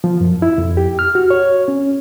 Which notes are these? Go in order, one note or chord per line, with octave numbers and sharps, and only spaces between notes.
F3
F#2
E4
F2
G4
F6
F#4
C#5
C#4